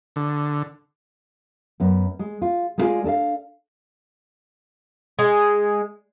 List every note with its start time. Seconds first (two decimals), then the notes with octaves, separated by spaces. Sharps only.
0.16 D3
1.80 F#2 B3
2.19 G#3
2.42 F4
2.78 G#3 B3 E4 F4 G#4 D5
3.04 D4 A4 D#5 F5
5.19 G#3